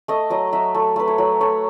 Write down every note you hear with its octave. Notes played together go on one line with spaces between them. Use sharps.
A3 D#5
F#3 D#5
F#3 E5
A3
A3 B4
C#5
F#3
A3 C#5